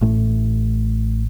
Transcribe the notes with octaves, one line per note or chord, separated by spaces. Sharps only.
A1 A2 A3